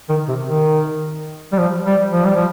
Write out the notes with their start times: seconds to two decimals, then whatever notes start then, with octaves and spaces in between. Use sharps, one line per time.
0.09 D#3
0.28 C3
0.46 D#3
1.53 G3
1.58 F3
1.87 G3
2.13 F3
2.25 G3
2.36 F3